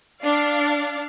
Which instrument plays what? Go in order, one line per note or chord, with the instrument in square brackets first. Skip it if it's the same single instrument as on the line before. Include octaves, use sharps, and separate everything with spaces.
[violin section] D4 D5 F5